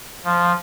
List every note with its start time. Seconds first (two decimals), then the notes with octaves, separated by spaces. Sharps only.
0.25 F3